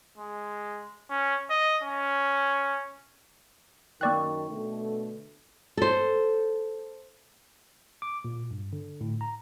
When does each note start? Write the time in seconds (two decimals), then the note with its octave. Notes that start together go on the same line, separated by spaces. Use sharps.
0.18 G#3
1.10 C#4
1.50 D#5
1.83 C#4
4.01 F#2 D#3 A#3 D5 G5 C#6 D6 F#6
4.50 B2 D3 A3
5.77 A4 C5
8.02 D6
8.25 A#2
8.51 G2
8.73 D3
9.01 A2
9.21 A#5